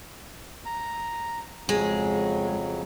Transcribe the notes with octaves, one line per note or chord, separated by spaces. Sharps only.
A#5
F2 C#3 F#3 G#3